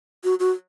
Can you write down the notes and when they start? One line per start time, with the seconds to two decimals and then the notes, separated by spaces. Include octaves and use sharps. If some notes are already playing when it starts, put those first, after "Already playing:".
0.24 F#4
0.40 F#4